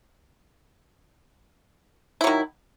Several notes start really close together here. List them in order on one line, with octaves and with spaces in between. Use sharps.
E4 F#3 D#3